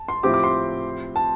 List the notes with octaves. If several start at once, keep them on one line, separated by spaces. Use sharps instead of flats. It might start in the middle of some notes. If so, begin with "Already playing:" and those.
Already playing: A5
C6
A2 F3 C4 G4 D6
D6
C6
A5